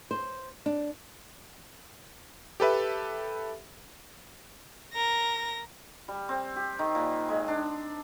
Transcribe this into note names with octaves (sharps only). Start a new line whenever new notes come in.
C5
D4
G4 A4 B4 E5
A#4 A#6
G3
C4
G4
D#3
A#2
G#3
D4